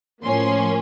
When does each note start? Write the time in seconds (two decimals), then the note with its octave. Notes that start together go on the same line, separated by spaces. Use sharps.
0.24 A2 F3 A#3 C#4 C6